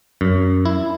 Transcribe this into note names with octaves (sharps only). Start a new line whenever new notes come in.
F#2
E4